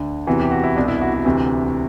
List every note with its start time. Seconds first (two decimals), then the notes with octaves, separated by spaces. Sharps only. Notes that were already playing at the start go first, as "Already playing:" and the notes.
Already playing: D2 D3
0.27 E2 C3 E3 F#4
0.40 G4
0.51 F#4
0.64 E4
0.76 C2 B2 D4
0.88 E4
1.01 F#4
1.14 F#4
1.25 D2 C3 E3